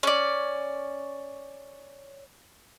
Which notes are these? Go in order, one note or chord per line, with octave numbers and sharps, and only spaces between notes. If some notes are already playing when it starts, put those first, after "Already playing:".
C#4 D5